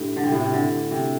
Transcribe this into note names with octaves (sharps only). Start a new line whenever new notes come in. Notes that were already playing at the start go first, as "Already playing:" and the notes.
Already playing: A2 D4 G4
D3
C3
A2
C3
D3
C3